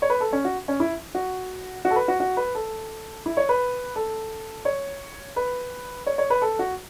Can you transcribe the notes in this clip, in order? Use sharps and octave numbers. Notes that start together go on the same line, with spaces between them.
C#5
B4
A4
C#4
F#4
C#4
E4
F#4
F#4
A4
B4
F#4
F#4
B4
A4
E4
C#5
B4
A4
C#5
B4
C#5
C#5
B4
A4
F#4